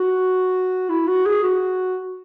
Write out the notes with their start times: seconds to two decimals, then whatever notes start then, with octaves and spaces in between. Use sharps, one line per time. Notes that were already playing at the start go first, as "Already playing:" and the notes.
Already playing: F#4
0.90 E4
1.07 F#4
1.26 G#4
1.43 F#4